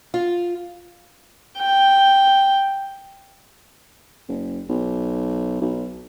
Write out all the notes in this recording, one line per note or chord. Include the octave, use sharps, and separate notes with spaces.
F4
G5
F#1
B1
B1